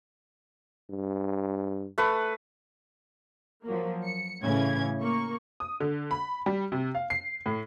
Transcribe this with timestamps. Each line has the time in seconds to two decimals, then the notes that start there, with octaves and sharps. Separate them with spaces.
0.90 G2
1.98 A3 B4
3.65 F3 F#3 A#3
4.04 C#7
4.41 A2 C#3 E3 C#4 G#6
5.01 A#3 C#6
5.60 D#6
5.80 D3
6.11 B5
6.46 G3
6.72 C3
6.95 F5
7.10 C7
7.46 A2